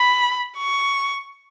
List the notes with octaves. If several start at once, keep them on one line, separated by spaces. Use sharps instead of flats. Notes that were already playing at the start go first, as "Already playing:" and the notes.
Already playing: B5
C#6